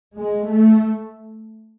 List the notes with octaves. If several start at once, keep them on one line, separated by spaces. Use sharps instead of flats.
G#3
A3